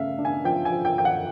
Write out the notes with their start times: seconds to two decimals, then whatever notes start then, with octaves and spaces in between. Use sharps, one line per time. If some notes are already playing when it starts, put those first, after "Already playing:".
Already playing: C#3 A3 E5 F5
0.18 D4
0.25 G#5
0.44 F3 G5
0.65 G#5
0.71 F3
0.85 G5
0.98 F3 G5
1.05 F#5